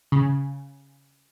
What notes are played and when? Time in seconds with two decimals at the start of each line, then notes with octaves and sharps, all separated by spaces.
0.12 C#3